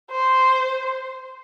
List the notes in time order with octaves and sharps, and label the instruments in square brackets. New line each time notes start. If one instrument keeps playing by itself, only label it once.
[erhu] C5